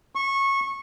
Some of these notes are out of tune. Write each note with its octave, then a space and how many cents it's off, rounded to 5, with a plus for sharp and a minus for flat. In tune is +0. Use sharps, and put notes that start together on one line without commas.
C#6 -20